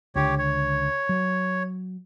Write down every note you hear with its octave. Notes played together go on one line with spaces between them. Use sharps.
C#2 D3 G4 C#5
C#5
F#3